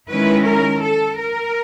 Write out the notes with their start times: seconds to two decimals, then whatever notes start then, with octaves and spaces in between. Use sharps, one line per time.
0.10 D#3 G#3 C#4 E4 B4
0.46 A#4
0.83 A4
1.19 A#4